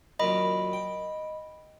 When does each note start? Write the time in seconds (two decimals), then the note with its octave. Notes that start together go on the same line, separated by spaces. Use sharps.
0.20 F#2 A#2 D#3 D#5 B5
0.73 G5